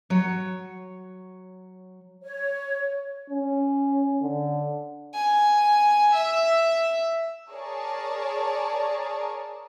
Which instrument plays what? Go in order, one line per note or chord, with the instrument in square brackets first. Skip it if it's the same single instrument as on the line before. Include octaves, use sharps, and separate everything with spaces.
[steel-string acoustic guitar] F#3 C#5
[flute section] C#5
[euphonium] C#4
D3
[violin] G#5
E5
[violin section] G#4 A#4 C#5 D5 A5